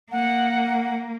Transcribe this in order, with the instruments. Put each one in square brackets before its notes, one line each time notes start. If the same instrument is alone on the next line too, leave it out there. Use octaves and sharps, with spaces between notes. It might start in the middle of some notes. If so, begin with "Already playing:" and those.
[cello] A#3 [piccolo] F#5